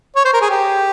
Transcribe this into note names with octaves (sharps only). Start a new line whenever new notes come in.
C#5
C5
A#4
G#4
G4